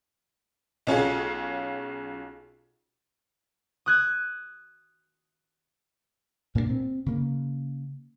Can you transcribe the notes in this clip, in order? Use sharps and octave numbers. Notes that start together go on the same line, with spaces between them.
B1 C#4 F4 G#4
D#6 F#6 G#6
A#2 A#3 B3 D4
C4
C#3 A#3